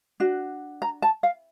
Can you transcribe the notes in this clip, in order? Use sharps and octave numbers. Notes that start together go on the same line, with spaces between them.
D4 F#4
A#5
A5
F5